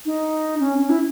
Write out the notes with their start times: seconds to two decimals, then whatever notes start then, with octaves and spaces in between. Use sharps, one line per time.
0.06 D#4
0.60 C#4
0.78 C#4
0.89 E4